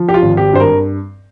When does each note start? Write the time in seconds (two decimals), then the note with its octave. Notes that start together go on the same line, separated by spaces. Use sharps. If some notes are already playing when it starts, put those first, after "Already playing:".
Already playing: F3
0.09 G4
0.14 F4
0.22 G#1
0.37 G4
0.53 G2 C5
0.60 A#4